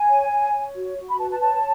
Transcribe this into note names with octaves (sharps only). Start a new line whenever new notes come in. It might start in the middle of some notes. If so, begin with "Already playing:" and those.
Already playing: G#5
C#5
C#5
C#5
F#4
F#4
B5
B4 A5
A5
C#5 A5